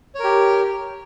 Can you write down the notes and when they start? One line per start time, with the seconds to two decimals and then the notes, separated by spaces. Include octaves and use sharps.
0.15 C#5
0.19 A#4
0.24 G4